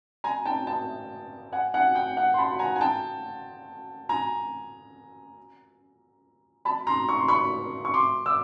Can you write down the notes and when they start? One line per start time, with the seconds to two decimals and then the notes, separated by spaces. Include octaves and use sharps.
0.24 G#5 A#5
0.45 G5 A5
0.67 G5 A5
1.52 F#5 G#5
1.74 F#5 G#5
1.95 G5
2.17 F#5
2.34 C6
2.38 A5 B5
2.59 G#5 A#5
2.76 G#5
2.81 G5 A5
4.09 G#5 A#5
6.65 A5 B5
6.87 A#5 C6
7.09 C#6
7.19 C6
7.28 B5 C#6
7.85 C#6
7.94 C6 D6
8.26 D6 E6